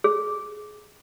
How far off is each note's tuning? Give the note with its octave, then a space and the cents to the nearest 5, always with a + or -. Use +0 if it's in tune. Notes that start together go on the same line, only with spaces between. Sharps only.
G#4 +20